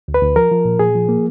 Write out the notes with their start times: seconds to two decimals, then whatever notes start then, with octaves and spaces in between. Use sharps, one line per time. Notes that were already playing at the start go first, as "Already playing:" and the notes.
0.08 D2
0.14 B4
0.22 D2
0.36 F3 A#4
0.52 F3
0.65 A#2
0.79 A#2 G#4
0.95 F3
1.09 A#3